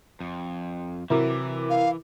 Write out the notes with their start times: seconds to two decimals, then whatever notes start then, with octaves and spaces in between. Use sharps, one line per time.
0.20 F2
1.10 C3 E3 F#3 E4 F#4 A#4 D6
1.70 F5